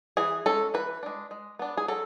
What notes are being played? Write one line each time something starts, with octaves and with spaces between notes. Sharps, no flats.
E3 G#4
G#3 C#4 A4
E3 B4
G#3 D4
G#3
B3 D4
G#4
F#3 A4